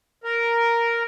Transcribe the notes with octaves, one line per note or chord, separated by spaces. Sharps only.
A#4